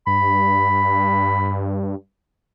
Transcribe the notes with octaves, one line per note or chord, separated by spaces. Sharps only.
G2 B5